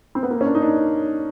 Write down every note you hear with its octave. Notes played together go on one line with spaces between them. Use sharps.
C4
B3
A#3
C#4
D4
D#4
D4